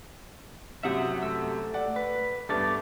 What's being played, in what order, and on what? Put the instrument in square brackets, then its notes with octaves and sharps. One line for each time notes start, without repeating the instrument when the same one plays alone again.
[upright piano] F#2 C3 F#3 [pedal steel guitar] E5 F#5 D#6
[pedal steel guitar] A3 E6
[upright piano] D5 F#5
[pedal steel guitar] B4
[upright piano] G2 A3 B3 [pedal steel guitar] A4 D5 A5